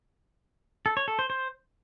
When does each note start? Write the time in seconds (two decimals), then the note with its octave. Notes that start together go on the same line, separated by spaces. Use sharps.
0.86 A4
0.97 C#5
1.08 A4
1.19 C5
1.30 C5